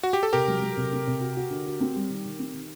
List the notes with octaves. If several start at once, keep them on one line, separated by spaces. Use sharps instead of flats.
F#4
G4
A4
C3 G4 A#4
F#3
F#3
C3
C4
C3
F#4
F#4
D3
F#4
C4
G3
D#3
D#3
C4
D#3